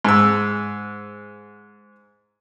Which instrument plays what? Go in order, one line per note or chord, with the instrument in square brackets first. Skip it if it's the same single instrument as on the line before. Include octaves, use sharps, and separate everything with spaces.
[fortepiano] G#2 E6